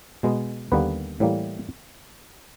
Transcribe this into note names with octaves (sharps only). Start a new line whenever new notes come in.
B2 G#3 B3
D#2 D3 G3 A#3 B3 B4
A2 E3 G3 A#3